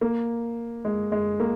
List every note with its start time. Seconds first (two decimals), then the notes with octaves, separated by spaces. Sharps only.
0.01 A#3
0.85 G#3
1.12 G#3
1.40 A#3